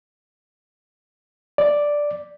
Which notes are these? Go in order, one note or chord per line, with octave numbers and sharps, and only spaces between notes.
D5